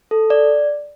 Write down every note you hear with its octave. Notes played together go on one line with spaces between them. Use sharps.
A4
D5